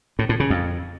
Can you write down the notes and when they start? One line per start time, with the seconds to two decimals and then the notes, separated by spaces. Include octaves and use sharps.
0.19 A2
0.29 A2
0.40 C#3
0.50 F2